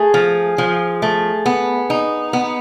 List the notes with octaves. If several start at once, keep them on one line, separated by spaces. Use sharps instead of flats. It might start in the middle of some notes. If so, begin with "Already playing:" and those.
Already playing: A3 G#4
F3
F3
A3
B3
D#4
B3